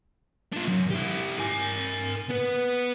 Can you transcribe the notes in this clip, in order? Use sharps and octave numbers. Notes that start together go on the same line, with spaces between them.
D4 F4
F#2
E4 G4
A#4 G#5
B3 B4